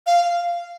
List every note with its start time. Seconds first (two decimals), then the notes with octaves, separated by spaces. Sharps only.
0.07 F5